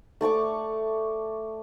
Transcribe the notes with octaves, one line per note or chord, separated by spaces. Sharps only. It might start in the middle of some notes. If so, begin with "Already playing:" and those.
A3 D5 C#6 D6